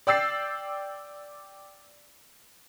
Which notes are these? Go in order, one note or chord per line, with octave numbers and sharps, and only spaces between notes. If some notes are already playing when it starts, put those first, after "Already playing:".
D5 G5 E6 A6 C7